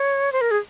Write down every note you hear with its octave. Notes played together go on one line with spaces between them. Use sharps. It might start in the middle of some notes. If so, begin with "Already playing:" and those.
Already playing: C#5
C5
A#4
G#4